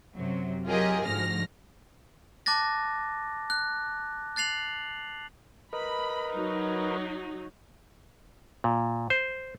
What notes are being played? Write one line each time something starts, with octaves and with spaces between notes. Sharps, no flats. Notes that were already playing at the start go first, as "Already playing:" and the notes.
F#2 C3 F#3
F#3 F4 G4 G#4 A#4 D#5
D2 G#2 F3 F6 A#6
A5 D6 F#6 A6 A#6
F#6
F#6 A6 C7 F7 F#7
A#4 B4 D#5 B5
F#3 D#4
A#2
C5